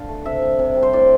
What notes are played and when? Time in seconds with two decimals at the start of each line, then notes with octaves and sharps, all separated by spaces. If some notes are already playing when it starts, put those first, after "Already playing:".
Already playing: D3 F5
0.08 A3
0.25 C3 E5
0.42 G3
0.59 C3
0.77 G3
0.83 C5
0.93 A2 D5